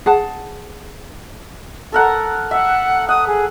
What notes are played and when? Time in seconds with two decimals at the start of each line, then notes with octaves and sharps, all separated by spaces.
0.06 G#4 F#5 A5
1.92 A4 A#4 F#5
2.51 E5 F#5
3.09 F#5 D#6
3.27 G#4